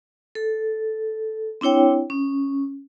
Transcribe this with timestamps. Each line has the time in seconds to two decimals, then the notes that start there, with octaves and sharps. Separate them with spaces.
0.35 A4
1.61 C4 D4 E4 C#5 G5
2.10 C#4